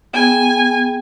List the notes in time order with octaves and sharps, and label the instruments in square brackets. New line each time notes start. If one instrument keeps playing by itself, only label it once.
[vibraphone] B3 G#4 G5 [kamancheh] G#5